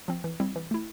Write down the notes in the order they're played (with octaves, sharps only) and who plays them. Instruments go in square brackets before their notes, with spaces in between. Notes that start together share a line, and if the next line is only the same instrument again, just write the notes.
[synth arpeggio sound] F3 C4
E3
G3 C4 E4
E3
A3 E4